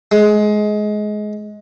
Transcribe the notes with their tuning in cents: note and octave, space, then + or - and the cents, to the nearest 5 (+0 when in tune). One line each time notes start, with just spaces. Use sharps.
G#3 +20